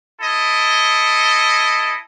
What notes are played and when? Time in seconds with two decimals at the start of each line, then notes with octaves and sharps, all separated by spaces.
0.21 E4 A4 D#5